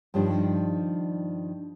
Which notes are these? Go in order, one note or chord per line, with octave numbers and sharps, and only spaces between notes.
G2 D#3 F3 G3 D4